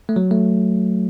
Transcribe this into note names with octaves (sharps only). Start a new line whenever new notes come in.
A3
F#3
A3